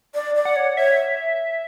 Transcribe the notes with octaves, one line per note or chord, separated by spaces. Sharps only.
D5
D5
F#5
C#5
C#5 E5